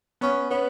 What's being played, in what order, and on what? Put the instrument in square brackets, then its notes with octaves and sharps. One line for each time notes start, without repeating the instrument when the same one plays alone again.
[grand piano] B3 [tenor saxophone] C#4
[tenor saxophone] B3 [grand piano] C#4